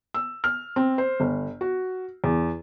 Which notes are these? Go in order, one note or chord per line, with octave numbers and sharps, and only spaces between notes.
E6
F6
C4
C5
G1
F#4
E2